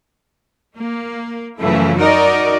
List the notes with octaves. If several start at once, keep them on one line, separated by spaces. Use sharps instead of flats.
A#3
F#2 C#3 E3 F3 A3 E4
D#4 F#4 A#4 D5 D#5